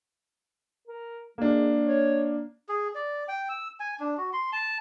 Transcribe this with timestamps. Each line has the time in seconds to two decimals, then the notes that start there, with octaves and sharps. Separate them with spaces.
0.88 A#4
1.38 G#3 A#3 D4
1.86 C#5
2.69 G#4
2.95 D5
3.28 G5
3.49 E6
3.80 G#5
4.00 D4
4.17 F#4
4.33 C6
4.53 A5